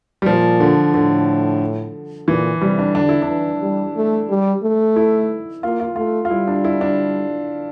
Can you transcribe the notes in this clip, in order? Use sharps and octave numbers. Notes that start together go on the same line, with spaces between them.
G3
A#2 F3
D3
A2 D3
A#2 E3
C3 G3
D4
D3 D4
E4
D4
E3
G3
A3
G3
A3
E4
A#3 F4
F4
A3 F4
F4
G3 E4
D4
E4
D4